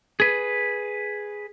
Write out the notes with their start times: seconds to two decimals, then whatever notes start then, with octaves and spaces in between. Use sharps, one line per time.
0.20 G#4 B4